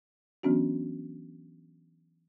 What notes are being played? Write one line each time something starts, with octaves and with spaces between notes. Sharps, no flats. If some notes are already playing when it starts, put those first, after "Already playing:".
E3 F#3 B3 C#4 D4 F#4